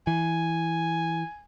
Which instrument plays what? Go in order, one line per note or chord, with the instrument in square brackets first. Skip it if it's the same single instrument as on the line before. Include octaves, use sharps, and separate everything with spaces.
[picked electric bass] E3 [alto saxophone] G#5